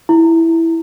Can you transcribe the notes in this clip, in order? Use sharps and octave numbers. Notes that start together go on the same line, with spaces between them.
E4